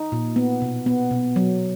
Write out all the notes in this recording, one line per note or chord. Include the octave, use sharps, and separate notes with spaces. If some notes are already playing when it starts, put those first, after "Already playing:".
Already playing: D#4
A#2
B3
B2
B3
B2
F#3